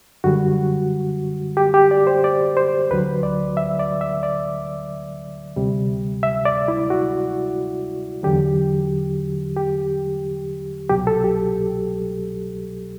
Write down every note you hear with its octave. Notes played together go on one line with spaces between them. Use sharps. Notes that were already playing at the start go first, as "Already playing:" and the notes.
F#2 D3 G3 F#4
G4
G4
D5
C5
D5
C5
D2 D3 F#3 B4
D5
E5
D5
E5
D5
D2 C3 G3
E5
D5
E4
F#4
E2 D3 F#3 G4
G4
C2 B2 F#3 G4
A4
G4